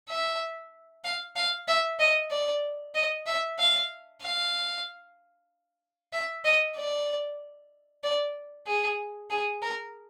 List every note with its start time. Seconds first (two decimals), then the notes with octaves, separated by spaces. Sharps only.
0.09 E5
1.04 F5
1.36 F5
1.68 E5
1.99 D#5
2.31 D5
2.95 D#5
3.27 E5
3.59 F5
4.22 F5
6.13 E5
6.45 D#5
6.76 D5
8.03 D5
8.67 G#4
9.30 G#4
9.62 A#4